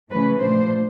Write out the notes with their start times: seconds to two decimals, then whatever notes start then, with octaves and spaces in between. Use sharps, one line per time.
0.12 C#3 E3 A3 C#4 B4
0.40 A#2 F3 A3 D4 C5